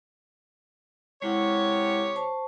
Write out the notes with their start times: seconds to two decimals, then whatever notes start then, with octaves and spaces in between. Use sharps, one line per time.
1.22 C3 G#3 E4 G4 C#5 F#5
2.16 C5 A5 C#6